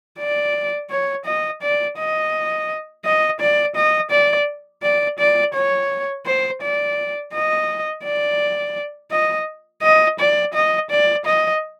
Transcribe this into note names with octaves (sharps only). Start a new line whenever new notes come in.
D5
C#5
D#5
D5
D#5
D#5
D5
D#5
D5
D5
D5
C#5
C5
D5
D#5
D5
D#5
D#5
D5
D#5
D5
D#5